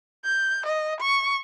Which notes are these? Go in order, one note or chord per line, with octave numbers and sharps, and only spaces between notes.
G6
D#5
C#6